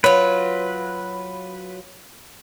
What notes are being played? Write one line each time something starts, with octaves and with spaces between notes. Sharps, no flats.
F#3 F4 B4